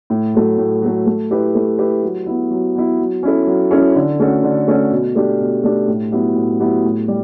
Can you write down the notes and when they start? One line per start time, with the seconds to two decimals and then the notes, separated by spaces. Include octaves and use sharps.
0.10 A2
0.34 F#3 A3
0.58 A2
0.82 F#3 A3
1.06 A3
1.31 E4 G4 B4
1.55 A3
1.79 E4 G4 B4
2.03 F#3
2.26 B3 E4
2.51 F#3
2.75 B3 E4
2.99 F#3
3.23 C#4 E4 A4
3.47 F#3
3.71 C#4 E4 A4
3.95 D3
4.19 A3 C#4 F#4 A4
4.43 D3
4.68 A3 C#4 F#4 A4
4.91 B2
5.15 A3 D4 G4
5.40 B2
5.64 A3 D4 G4
5.88 A2
6.12 F#3 B3 E4 G4
6.36 A2
6.60 F#3 B3 E4 G4
6.84 A2
7.08 G3